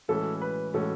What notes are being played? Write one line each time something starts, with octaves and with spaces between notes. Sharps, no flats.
A2 E3 G#3 C#4 F#4 A4
B4
A2 E3 G#3 C#4 F#4 A4